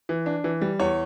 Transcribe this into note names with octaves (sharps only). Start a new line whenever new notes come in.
E3
D4
E3
G3
E2 C#5